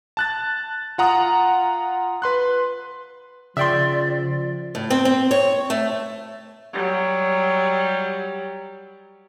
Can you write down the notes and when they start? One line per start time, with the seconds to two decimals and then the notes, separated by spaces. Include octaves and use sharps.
0.17 A5 F#6 A6
0.98 F4 F#5 A#5 D#6
2.22 B4 C6 F#6
3.57 C#3 F3 D5 E5 G5 C6
4.75 A2
4.90 C4
5.05 C4
5.31 C#5
5.70 A3
6.73 F#3 G3